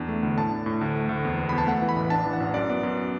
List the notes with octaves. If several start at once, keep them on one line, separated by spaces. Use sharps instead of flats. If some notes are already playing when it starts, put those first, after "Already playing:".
Already playing: E2 D4
A3
D2
A2 A5
D4
A2
D2
A3
D2
E2
B3
E2 B5
A5
A3 F#5
E3
B5
A1
D4 A5
E3
F#5
A1
F#2 D5
B3
F#2